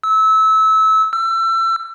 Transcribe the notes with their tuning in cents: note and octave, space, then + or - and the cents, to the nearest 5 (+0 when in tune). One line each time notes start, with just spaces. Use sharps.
E6 -25
E6 +30